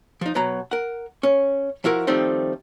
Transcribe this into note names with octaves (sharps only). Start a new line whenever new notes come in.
F3 D#4
B2 F#3 A#5
A#4 F#5
C#4
F3 E4 F#4 A#4
D#3 F3 G3 A3 C4 D#4